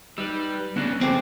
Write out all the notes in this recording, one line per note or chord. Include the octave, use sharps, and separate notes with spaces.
G3 D#4 B4 E6
G2 C#3 B3 D4 D5 F#6 A#6
C#3 F3 A3 C4 C#4 G5 D6